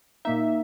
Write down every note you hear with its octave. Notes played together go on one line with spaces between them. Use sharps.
A#2 A#3 D#4 E5